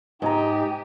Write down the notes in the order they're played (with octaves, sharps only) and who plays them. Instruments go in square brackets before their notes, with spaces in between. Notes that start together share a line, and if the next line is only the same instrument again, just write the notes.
[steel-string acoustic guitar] G#2 [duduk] D#4 [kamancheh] G4 [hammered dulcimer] G#5 A#5